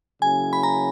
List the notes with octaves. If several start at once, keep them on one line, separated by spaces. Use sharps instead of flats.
C#3 F#3 A#3 C#4 E4 G#5
B5
A#5